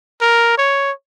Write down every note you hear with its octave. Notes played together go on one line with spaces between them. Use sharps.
A#4
C#5